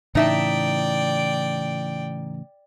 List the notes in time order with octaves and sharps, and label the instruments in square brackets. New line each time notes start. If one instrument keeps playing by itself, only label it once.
[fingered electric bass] A2 C#3 E3 [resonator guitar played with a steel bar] D#4 E5 A5 [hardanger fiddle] D5 G5